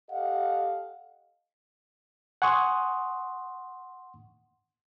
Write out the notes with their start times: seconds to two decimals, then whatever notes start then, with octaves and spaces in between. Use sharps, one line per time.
0.11 G4 A4 D#5 F5 F#5
2.42 F#5 G#5 C6 C#6 D#6